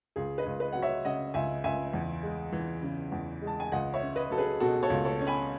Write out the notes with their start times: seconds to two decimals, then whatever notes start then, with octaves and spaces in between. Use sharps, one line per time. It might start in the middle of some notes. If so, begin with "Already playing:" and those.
0.16 C#2 G#4
0.38 B4 D#5
0.46 C#2
0.60 B4 D#5
0.72 F#3 F#5
0.82 C#5 E5
1.05 C#3 D#5 F#5
1.34 C#2 E5 G#5
1.64 C#2 E5 G#5
1.93 E2
2.23 G#3
2.52 E3
2.83 C#3
3.12 E2
3.42 G#3
3.47 A5
3.60 G#5
3.72 C#2 D#5 F#5
3.94 C#5 E5
4.01 C#4
4.16 B4 D#5
4.31 F#3 A4
4.38 G#4 B4
4.60 B2 F#4 A4
4.83 A4 C#5
4.90 C#2
5.05 A4 C#5
5.20 C#4
5.27 G#5 B5